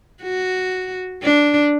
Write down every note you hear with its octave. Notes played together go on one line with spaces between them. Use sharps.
F#4
D4